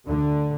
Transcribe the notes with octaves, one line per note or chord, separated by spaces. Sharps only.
D2 D3